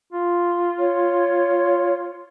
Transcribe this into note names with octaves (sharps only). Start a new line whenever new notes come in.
F4
C#5